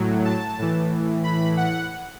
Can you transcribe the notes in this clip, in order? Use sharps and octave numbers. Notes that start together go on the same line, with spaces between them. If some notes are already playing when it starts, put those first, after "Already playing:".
Already playing: A2 F#3
A5
A2 E3
B5
F#5